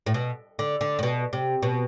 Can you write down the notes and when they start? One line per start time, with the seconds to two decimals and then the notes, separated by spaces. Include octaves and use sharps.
0.06 A2
0.14 B2
0.59 D3
0.81 D3
0.99 A2
1.03 B2
1.33 C3
1.62 B2